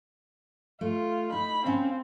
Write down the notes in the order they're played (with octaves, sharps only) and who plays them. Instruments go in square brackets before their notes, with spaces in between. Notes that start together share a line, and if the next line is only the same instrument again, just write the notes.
[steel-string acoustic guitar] A3 [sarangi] F4
[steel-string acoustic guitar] D#4 [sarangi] B5
[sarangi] C4 [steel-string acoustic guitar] C#4 F5